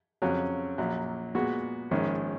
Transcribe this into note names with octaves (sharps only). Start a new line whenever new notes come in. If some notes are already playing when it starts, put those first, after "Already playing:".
F2 C#3 F#3 C#4
A#1 A#2 F#3
A#2 G#3 B3 F#4
A#1 G#2 D#3 A#3 C#4